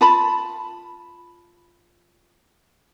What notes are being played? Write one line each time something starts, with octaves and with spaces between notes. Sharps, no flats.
F4 A5 B5